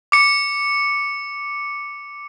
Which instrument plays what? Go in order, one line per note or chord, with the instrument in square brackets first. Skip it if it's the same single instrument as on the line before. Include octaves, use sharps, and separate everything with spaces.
[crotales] D6 C#7